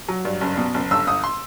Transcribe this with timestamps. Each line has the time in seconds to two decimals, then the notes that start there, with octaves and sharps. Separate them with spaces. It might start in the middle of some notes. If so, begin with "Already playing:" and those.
0.08 F#3
0.25 G2
0.41 F#1
0.57 B2
0.74 F#1
0.91 G1 E6
1.07 G1 D#6
1.24 C6